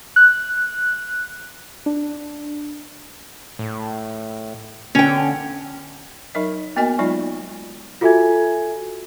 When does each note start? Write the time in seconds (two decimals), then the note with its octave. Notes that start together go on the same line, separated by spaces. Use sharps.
0.16 F#6
1.86 D4
3.59 A2
4.95 D3 C#4 G5
6.35 F#3 D#4 A#4 D#5 E5
6.76 A#3 B3 F#4 A#4 D#5 G#5
6.99 F#3 G#3 D#4 F4 D5
8.01 F4 F#4 A4 E5 G#5 G#6